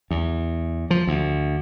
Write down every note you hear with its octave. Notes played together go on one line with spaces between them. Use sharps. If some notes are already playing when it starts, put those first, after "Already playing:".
E2
F3
D2